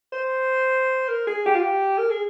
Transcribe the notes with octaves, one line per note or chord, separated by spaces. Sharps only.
C5
A#4
G#4
G4
F4
G4
A#4
G#4